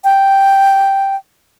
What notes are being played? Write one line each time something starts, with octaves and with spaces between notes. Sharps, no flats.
G5